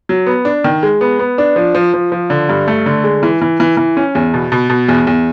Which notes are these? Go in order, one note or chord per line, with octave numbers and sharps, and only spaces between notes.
F#3
B3
D4
D#3
G#3
B3
B3
D4
F3
F3
F3
F3
D3
G2
A3
D3
G#3
E3
E3
E3
E3
C#4
E2
B2
B2
B2
E2
E2